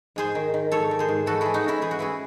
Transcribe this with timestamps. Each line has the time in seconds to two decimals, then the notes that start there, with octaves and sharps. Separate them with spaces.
0.16 G#2 G#4 C5
0.35 D#3
0.54 D#3
0.72 G#2 A4 C#5
0.91 D#3
0.99 G#4 C5
1.08 G#2
1.26 E3 F#4 A4
1.41 E3 E4 G#4
1.54 D#4 F#4
1.64 G#2 C#4 E4
1.81 E3 G#4
1.91 F#4
1.99 E3 E4 G#4